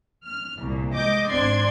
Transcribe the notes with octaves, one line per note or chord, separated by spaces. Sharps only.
F6
C2 A#2
G#3 D#5 D6 G6
G#1 C4 D4 D5 C6 G#6